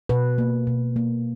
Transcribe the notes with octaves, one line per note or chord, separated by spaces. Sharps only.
B2 B4
A#3
B2
A#3